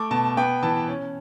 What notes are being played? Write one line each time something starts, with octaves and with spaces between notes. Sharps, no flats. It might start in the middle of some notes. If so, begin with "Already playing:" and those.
Already playing: A3 D6
B2 A5
B3 G5
E3 A5
C#4